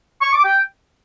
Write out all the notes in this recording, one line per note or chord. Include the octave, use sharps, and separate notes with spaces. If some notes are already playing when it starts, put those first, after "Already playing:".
C#6
D6
G5